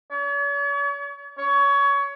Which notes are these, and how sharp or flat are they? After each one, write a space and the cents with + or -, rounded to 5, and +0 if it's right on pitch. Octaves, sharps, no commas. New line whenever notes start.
C#5 +45
C#5 +20